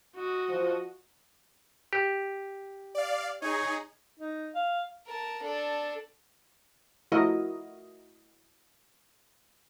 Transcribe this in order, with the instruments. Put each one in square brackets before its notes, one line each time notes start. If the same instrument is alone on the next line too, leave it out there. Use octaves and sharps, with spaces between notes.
[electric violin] F#4 D#5
[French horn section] F3
[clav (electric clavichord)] G4
[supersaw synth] D5 F5
[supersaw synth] D#4 G#4 [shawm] C#5
[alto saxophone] D#4
F5
[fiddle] A#4 A5
D4 A4
[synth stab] F3 A3 E4 F#4 A#4 D#5